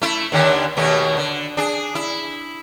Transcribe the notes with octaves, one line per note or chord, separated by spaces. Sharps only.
A3 E4
D#2 D3 D#3
D#2 B2 A3
D3
D4 G#4
E4